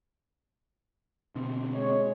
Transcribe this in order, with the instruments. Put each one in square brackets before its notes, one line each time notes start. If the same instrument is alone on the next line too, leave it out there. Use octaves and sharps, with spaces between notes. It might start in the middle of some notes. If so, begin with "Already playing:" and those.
[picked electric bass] B2 D3 C4
[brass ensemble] G#3 C#5